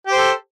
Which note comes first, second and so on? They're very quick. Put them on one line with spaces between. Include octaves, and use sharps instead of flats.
G4 C5 A4